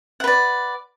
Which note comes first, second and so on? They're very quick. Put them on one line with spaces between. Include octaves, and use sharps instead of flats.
F#5 B4 D5